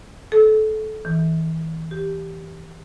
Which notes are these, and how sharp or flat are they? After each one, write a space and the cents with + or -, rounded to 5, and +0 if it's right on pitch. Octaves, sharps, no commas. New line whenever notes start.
A4 -25
E3 -35
G4 +0